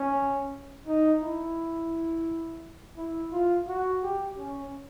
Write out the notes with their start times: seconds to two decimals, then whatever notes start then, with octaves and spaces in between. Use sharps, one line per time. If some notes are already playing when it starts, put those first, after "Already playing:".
Already playing: C#4
0.87 D#4
1.22 E4
2.98 E4
3.32 F4
3.68 F#4
4.03 G4
4.38 C#4